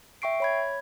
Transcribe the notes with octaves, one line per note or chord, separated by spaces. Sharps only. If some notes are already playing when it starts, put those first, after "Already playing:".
E5 G5 C#6 C7 D7
C#5 B5 G#6